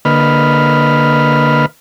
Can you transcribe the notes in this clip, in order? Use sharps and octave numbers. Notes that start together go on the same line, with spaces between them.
D3 A#3 B4 D#5 B5 F6